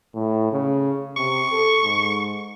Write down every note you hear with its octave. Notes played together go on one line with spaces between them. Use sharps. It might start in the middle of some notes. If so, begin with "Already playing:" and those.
A2
C#3
C3 C#6
A4
G#2